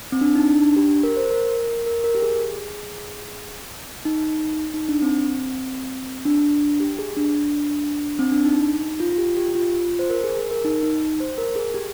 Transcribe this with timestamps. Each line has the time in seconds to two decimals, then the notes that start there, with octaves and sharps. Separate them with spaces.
0.12 C4
0.21 D4
0.35 D#4
0.48 D4
0.62 D4
0.76 G4
1.03 A#4
1.17 C5
1.31 A#4
1.86 A#4
2.04 A#4
2.15 G4
2.22 G#4
4.05 D#4
4.74 D#4
4.89 D4
5.02 C4
6.25 D4
6.80 G4
6.99 G#4
7.17 D4
8.19 C4
8.32 D4
8.45 D#4
9.00 F4
9.12 F4
9.18 G4
9.37 G4
9.55 F4
9.99 C5
10.10 A#4
10.24 G#4
10.37 G#4
10.51 A#4
10.65 D#4
10.83 D#4
11.20 C5
11.38 A#4
11.56 G#4
11.74 G4